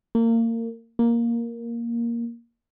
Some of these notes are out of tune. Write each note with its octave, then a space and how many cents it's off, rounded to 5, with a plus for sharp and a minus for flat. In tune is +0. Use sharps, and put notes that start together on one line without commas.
A#3 -30
A#3 +5